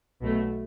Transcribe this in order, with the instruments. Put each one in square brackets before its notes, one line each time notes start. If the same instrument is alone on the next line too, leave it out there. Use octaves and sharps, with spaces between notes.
[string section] B1 B2 A3